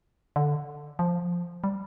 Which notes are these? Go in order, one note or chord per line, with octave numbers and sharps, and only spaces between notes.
D3
F3
G3